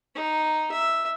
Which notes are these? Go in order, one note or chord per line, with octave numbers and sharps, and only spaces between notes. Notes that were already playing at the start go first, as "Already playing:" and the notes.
D#4
E5